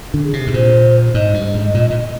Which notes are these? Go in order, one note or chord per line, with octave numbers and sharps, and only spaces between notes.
D3
G#4
C3
G#2
A#2 C5
G#2 D#5
G2
G#2
A#2
A#2